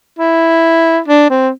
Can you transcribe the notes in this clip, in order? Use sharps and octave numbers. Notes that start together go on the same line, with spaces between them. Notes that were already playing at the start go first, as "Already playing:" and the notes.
E4
D4
C4